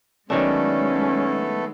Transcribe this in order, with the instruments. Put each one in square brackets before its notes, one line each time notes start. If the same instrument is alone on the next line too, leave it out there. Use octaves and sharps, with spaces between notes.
[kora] D#3 F#3 D4 [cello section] G#3 [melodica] A3 B3 A4 [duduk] C#4